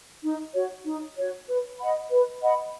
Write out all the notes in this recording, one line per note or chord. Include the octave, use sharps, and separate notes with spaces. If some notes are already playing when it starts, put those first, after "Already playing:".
D#4
F#4 C#5
D#4
F#4 C#5
B4
D#5 F#5 B5
B4
D#5 F#5 B5